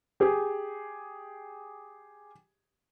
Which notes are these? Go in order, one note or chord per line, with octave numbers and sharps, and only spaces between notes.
G4 G#4